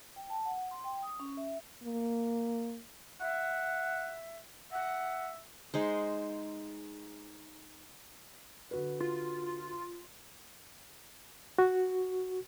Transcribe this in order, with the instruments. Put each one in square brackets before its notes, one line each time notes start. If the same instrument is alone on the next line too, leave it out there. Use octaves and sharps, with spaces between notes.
[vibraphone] G5
A5
F#5
C6
G5
D#6
C#4
E5
[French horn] A#3
[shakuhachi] E5 [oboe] F#5
[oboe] E5 [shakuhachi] F#5
[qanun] G#3 D#4 C5
[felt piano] D3 F#4 B4
[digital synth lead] F4
[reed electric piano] F#4